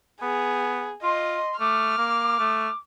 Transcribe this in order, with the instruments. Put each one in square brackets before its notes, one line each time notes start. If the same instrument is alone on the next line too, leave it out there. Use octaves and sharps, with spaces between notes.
[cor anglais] B3 [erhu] G#4
[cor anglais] F4 [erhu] D#5 [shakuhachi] C6
[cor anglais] A3 [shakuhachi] D6 [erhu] F6
[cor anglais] A#3
A3